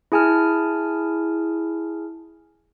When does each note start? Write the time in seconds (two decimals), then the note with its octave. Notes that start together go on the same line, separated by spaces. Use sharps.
0.12 E4 G#4 G#5 A5 F6